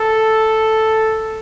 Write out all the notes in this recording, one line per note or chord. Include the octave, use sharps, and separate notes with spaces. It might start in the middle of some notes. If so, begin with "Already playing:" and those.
Already playing: A4